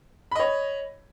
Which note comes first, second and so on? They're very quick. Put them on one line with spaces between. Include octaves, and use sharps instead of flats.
B5 D#5 C#5